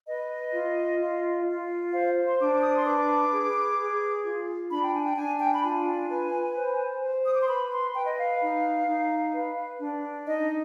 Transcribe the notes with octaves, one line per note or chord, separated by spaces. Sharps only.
B4 D#5
F4
F4
F4
C5 F5
C6
D4 D6
D6
D#6
C6
B4 D6
G#4
G#4
F4
D4 B5
G5
G#5
G5
D4 G#5
G5
B5
F4 G#5
B4
C5
C5
D#6
D6
C6
B4 B5
C6
B4 G5
D#5
F5
D#4
D#4
B4
D4
D#4 D#5